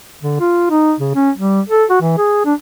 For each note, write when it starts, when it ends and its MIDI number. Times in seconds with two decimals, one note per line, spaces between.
0.23 0.36 50
0.40 0.66 65
0.70 0.94 63
0.99 1.13 49
1.15 1.31 61
1.37 1.61 55
1.69 1.85 69
1.90 1.97 66
2.01 2.13 52
2.18 2.45 68
2.45 2.54 62